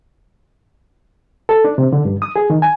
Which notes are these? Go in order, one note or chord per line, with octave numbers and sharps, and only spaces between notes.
A4
D4
C3
D3
G2
D#6
G#4
D#3
G#5